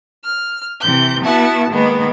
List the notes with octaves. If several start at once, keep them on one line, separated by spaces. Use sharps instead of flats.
F6
C3 E3 G6
B3 E4 F#4 E5 A5
D#3 G#3 A#3 B3